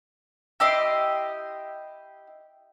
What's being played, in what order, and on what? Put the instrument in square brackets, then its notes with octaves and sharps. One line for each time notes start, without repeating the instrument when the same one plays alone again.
[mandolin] E4 G4 D#5 C6